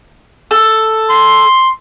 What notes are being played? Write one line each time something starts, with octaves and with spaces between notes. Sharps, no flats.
A4
C6